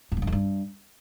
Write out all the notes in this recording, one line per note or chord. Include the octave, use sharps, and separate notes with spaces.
G2
A2
G2
F2
G2